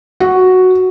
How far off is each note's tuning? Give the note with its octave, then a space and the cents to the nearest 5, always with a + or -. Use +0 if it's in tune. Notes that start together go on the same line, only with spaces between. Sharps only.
F#4 +0